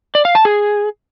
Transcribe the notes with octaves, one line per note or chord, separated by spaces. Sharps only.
D5
F5
A5
G#4